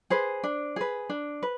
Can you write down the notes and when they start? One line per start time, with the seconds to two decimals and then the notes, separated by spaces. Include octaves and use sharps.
0.10 G#4 B4 C5
0.44 D4
0.76 G#4 B4
1.10 D4
1.43 B4